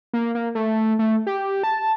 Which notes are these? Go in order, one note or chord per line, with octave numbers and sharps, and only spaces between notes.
A#3
A#3
A3
A3
G4
A5